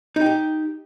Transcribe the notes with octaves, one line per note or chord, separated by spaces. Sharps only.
D#4 G4 G5